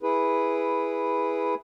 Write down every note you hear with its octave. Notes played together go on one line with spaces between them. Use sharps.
E4 G#4 B4